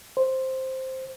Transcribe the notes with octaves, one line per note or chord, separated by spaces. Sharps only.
C5